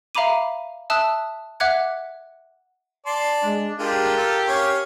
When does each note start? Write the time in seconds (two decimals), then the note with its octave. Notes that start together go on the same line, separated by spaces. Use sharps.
0.15 E5 F5 A#5 B5 D6 D#7
0.90 E5 A5 D#6 E6 F#6
1.60 E5 F#5 D6 F#6 G#6 C#7
3.06 D5 A5 C6
3.42 G#3 D4
3.79 G#3 D4 F4 G4 A#4
4.17 F4 A4
4.48 C#4 C#5 F5